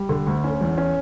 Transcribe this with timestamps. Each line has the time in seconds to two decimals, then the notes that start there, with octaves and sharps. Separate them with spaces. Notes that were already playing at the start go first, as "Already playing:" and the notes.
Already playing: G3
0.09 D3
0.26 D2
0.44 C#4
0.61 E2
0.78 C#4